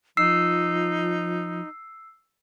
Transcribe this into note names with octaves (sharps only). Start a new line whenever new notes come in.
F3 D#4 E6 C7